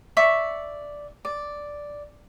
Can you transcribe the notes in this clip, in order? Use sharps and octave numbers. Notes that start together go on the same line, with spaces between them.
D5 E5 C#6
D5